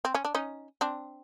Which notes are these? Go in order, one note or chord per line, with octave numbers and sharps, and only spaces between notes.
C4
C#4
D4
C#4 D#4
C4 D4